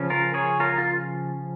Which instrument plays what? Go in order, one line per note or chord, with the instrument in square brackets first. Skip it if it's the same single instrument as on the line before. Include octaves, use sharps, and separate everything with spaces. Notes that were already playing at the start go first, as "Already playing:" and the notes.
Already playing: [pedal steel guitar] C#3 F3 C#4
F4 A#4
G#4 C#5
F4 A#4
F4